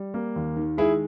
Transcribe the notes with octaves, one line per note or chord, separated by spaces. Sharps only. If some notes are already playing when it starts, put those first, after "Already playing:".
Already playing: G3
A#3
D#2
D#3
G#3 E4 G#4